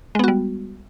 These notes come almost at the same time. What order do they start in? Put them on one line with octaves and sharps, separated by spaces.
G#3 B3 F#4 G3